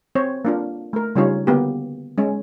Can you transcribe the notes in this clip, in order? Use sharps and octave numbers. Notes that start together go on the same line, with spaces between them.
C4 C5 C#5
A#3 D4 F4
A3 A#4
C#3 G3 C#4 D#4 F4 C#5
D3 A#3 B3 G4
G#3 C#4